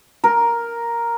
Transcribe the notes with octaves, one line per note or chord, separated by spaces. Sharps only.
A#4